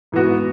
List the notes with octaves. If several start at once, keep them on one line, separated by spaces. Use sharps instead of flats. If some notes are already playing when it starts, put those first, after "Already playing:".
G#2 E3 B3 F#4